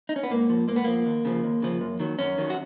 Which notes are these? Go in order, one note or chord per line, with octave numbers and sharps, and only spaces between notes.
D#4
C#4
B3
G#2 A#3
F3
G#2 A#3
B3
F3 A#3
D#2
C#3 F3
D#2
C#3 F3
F#2
D#3 F#3
F#2 C#4
D#3 F#3
F#4